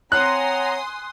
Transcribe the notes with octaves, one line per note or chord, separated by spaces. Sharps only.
C4 C#5 F#5 G#5 A#5 C6 D#6 F#6